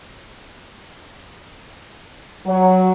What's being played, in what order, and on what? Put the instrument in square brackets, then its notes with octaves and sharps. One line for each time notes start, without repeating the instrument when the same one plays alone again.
[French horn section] F#3